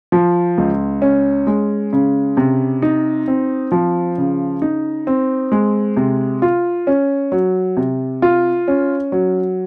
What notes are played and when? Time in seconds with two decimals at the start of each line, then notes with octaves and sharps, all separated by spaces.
0.12 F3
0.58 C#2
1.02 C#4
1.47 G#3
1.93 C#3
2.37 C3
2.82 D#4
3.28 C4
3.72 F3
4.18 C#3
4.62 D#4
5.07 C4
5.52 G#3
5.97 C3
6.42 F4
6.87 C#4
7.32 F#3
7.77 C3
8.22 F4
8.68 C#4
9.12 F#3